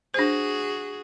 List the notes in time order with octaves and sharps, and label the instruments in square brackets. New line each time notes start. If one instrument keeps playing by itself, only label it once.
[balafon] D4 C5 [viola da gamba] F#4 G#4